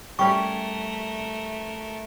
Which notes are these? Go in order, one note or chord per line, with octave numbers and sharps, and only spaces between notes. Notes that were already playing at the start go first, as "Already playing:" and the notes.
G3 A3 C#4 G4 A#4 C#6